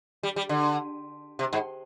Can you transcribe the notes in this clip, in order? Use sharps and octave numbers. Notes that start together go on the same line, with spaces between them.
G3
G3
D3
C3
G#2